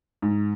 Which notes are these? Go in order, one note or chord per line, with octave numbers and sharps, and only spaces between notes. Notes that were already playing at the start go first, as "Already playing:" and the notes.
G#2